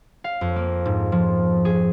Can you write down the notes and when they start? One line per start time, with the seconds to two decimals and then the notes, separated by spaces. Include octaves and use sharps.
0.24 F5
0.41 F2
0.56 A#3
0.85 G#2
1.12 F3
1.65 G#4